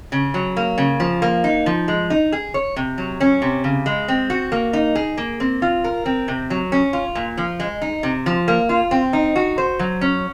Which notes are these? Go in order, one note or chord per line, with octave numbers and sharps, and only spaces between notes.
C#3
F#3
A#3
C#3
F3
A#3
D#4
F3
G#3
D#4
G#4
C#5
C3
F#3
C#4
C3
C#3
G#3
C4
F#4
A#3
D#4
G#4
A#3
C4
F4
A#4
C4
C3
F#3
C#4
F4
A#2
F3
G#3
D#4
C3
F3
A#3
F4
C4
D#4
F#4
C5
F#3
C#4